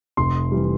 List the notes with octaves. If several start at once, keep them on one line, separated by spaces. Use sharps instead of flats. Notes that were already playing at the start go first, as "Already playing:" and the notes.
F1 C6
E3 G3